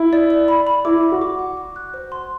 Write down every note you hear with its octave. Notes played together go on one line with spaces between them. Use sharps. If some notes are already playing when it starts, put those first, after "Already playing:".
Already playing: E4
D5
D5
B5
B5
E4 D6
B5
F#4
D6
F#5
D6
F#6
C5
C6